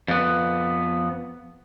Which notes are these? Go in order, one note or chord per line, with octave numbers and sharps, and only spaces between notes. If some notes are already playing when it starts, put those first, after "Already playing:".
F2 B3